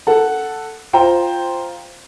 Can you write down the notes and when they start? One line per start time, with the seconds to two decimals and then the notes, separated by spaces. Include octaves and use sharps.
0.07 A4 F#5 A5
0.93 F4 C5 G5 A#5